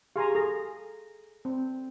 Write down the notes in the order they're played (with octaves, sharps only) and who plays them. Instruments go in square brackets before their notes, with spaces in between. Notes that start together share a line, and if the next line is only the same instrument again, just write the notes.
[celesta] G4 G#4 C6 [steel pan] F5 G#5 A#5
[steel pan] G#4 [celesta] A4 A#6
[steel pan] C4